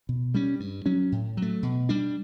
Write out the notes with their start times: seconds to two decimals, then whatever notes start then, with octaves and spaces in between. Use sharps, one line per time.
0.09 B2
0.34 G3 C#4
0.60 G2
0.86 F#3 C#4
1.12 A2
1.37 F#3 A3
1.63 B2
1.89 G3 D4